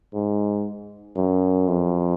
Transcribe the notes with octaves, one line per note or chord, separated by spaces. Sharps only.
G#2
F#2
F2